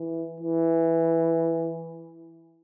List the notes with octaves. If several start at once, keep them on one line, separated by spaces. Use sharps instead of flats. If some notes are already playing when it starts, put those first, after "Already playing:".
Already playing: E3
E3